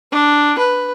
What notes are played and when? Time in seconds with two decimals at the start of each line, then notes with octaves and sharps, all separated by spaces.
0.12 D4
0.58 B4